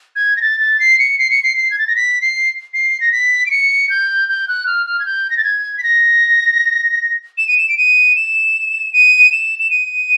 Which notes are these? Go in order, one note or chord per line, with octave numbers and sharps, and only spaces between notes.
G#6
A#6
A6
A6
C7
C#7
C7
C#7
C7
C7
G#6
A6
A#6
B6
C7
C7
A#6
B6
D7
C#7
G6
G6
F#6
F6
F6
G#6
G6
A#6
A6
G#6
B6
A#6
E7
D#7
E7
D7
D#7
E7
D#7
E7
E7
D#7